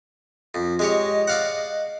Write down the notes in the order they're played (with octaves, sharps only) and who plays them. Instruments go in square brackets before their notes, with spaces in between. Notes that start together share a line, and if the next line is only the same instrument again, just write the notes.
[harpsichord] F2
[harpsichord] G#3 G4 C#5 [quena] D#5
[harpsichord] D5 F5 F#5